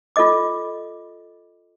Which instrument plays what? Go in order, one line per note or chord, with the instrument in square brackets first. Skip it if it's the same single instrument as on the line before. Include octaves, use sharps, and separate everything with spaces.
[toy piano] F4 A4 D5 D#5 D6